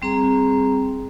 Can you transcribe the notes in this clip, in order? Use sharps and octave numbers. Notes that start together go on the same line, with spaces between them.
G3 C4 G#4 A#5